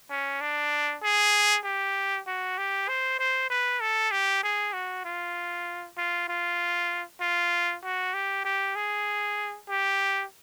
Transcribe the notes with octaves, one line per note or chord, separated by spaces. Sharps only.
C#4
D4
G#4
G4
F#4
G4
C5
C5
B4
A4
G4
G#4
F#4
F4
F4
F4
F4
F#4
G4
G4
G#4
G4